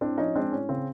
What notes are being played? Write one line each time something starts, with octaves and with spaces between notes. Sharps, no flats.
A2 C4 D4
F3 C#4 D#4
G#3 C4 D4
A2 C#4
C#3 C4